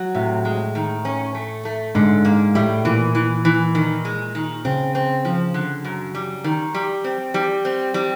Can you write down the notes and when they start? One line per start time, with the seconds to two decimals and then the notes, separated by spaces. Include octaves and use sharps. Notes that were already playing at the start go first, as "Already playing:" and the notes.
Already playing: F#3
0.15 A2 C3
0.45 G#3
0.75 D#3
1.05 C#4
1.35 A3
1.65 A3
1.95 G#2 D3
2.25 G#2 A#3
2.55 A2 G3
2.85 A#2 E3
3.15 E3
3.45 E3
3.75 D#3
4.05 G#3
4.35 D#3
4.65 C#3 C4
4.95 C4
5.25 F3
5.54 D3
5.85 F#2
6.15 G3
6.44 D#3
6.74 G3
7.04 C4
7.34 G3
7.65 C4
7.94 G3